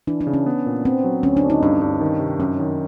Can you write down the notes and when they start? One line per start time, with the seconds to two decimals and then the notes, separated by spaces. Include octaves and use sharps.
0.07 E3 D4
0.21 D4
0.27 C#3
0.33 C#4
0.46 B3
0.66 A#2
0.85 B3 C4
1.04 F#3
1.23 D2 C#4
1.37 D4
1.43 D2
1.50 D#4
1.62 G2 D4
1.82 G2
2.01 D#3
2.20 C3
2.39 F#2 C#4
2.60 D#3